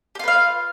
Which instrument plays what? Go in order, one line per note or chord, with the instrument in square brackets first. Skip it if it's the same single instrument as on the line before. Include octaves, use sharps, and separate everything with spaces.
[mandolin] G4
F4
B4
F5